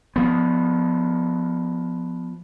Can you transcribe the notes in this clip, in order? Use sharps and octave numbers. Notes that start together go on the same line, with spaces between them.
F3 B3